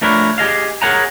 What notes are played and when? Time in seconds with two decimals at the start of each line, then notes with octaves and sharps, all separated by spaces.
0.01 F3 A3 D4 A#4 B4 C#5
0.38 G4 G#4 D#5 F5
0.82 G#4 A#4 C#5 F#5 G#5 A#5